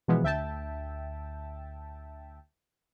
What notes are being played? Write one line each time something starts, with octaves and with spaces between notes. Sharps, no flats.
B2 E3 F3 G#3 B3
D2 E5 G5 A5